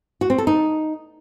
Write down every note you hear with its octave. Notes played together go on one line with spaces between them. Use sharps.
F#4
C4
A4
D#4